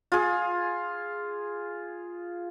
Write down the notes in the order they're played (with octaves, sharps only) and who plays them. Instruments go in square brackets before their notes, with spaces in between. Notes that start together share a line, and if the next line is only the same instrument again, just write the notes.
[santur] F4 G#4